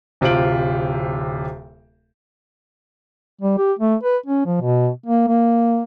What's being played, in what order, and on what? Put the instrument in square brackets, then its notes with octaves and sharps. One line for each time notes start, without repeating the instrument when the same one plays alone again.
[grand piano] D1 C3 F4 C5 D7 F#7
[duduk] G3
G4
A3
B4
C#4
F3
B2
A#3
A#3